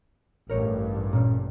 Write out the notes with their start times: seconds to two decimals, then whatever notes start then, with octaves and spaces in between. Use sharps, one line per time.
0.50 A1 G2 A#4 C#5
1.13 A#2 C#4